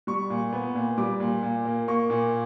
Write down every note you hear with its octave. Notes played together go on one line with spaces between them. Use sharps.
G3 C#6
A#2
B3
A#2
G3 D6
A#2
A#2
A#3
A#3 C#6
A#2